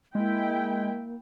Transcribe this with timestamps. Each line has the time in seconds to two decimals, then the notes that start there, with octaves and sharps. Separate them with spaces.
0.15 G#3 A#3 E4 G5